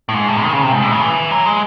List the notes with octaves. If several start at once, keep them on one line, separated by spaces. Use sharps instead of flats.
A2
G#2
A2
D#3
C#3
C3
G#2
A2
C#3
E3
F#3
G#3